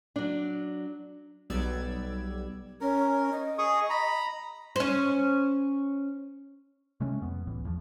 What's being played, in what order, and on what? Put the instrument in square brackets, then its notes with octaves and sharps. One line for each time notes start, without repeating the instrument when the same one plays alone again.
[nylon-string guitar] F#3 D4
[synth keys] B1 G3 B3 D5 E6 G#6
[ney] C#4 [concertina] A#4
[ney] D#5
[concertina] G#4 C#6 D#6
A#5 B5
[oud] C#4 C5
[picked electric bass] C3 G#3 A3 C#4
F2 B3
F1 C#2 A2 E3
E2 F3